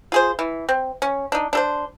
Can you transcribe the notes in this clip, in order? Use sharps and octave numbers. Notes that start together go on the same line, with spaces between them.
F4 G#4 C5
E3
C4
C#4
D4 D#4
D4 A4 C5